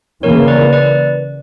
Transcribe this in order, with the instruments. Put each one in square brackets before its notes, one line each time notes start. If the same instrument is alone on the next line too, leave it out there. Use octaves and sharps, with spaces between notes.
[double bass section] C#3 E3 A#3 [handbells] A#4 C#5
[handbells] B4 D5
B4 D5